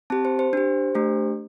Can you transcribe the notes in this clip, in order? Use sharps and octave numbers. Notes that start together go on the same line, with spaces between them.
C4 G4 A5
C5
C5
D4 G4 C5
A3 D4 G4